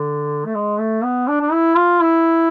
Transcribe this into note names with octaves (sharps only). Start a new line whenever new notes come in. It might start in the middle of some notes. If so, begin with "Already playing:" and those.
Already playing: D3
A3
G#3
A3
B3
D4
D4
E4
F4
E4